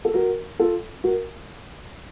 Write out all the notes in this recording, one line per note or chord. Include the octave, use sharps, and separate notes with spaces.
A4
F#4 A#4
F4 A4
F#4 A#4